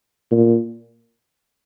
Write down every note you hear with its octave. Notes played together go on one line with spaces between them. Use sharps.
A#2